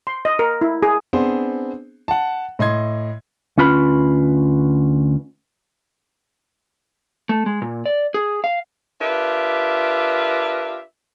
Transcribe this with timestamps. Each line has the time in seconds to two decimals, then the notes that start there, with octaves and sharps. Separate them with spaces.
0.07 C6
0.25 D#5
0.39 A#4
0.61 E4
0.83 G#4
1.13 B3 C4 D4 G#4 C5
2.08 F#5 A5
2.59 A2 D#5 C6 G#6
3.58 D2 C#4 F4 B4 B5
7.29 A3
7.46 G#3
7.62 A#2
7.86 D5
8.14 G#4
8.44 F5
9.00 D4 F4 G4 A#4 B4 E5